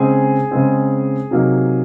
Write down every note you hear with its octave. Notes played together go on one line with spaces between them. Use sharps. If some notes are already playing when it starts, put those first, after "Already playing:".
Already playing: C#3 G#3 C4 G#4 G#5
C#3 G#3 C4
C3 F#3 A#3 D#4